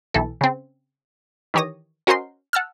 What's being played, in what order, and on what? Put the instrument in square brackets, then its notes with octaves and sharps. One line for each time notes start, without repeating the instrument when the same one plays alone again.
[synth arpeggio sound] B1 E3 A4
C#3 C4
D#3 E3 G4 C#5 D#6 A#6
C#4 F#4 A#4 C5 D#5 C6
F#5 A5 E6 F6